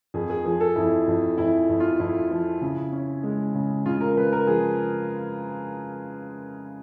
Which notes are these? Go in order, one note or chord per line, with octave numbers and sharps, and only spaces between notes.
F2 G#4
G#4
F3 G#4
A4
F2 E4
F2
F2 E4
F2
F4
F2 E4
F3
C#3
C#4
G#3
C#3
C#3 F4
A#4
C#3 B4
A#4
F3 G#4